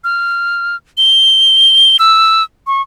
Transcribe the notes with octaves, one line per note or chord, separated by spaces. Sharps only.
F6
G7
E6
C#6